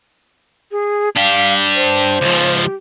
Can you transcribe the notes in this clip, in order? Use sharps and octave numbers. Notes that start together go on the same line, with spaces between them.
G#4
D4 G4 F5
C5
C#2 F3
G4